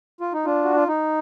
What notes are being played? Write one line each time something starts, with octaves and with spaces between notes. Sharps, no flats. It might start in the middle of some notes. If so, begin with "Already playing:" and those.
F4
D#4
D4 F4
F#4
F4
D#4